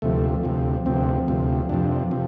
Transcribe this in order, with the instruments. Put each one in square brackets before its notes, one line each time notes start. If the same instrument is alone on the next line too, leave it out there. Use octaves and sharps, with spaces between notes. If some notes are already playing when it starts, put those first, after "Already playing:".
[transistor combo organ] D2 C3 F3 A3
D2 C3 F3
D2 C3 F3 C4
D2 C3 F3
F2 C3 F3 D4
C3 F3